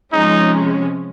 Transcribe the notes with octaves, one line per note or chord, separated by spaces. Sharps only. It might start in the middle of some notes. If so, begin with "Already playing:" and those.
C3 F3 G#3 C#4 D#4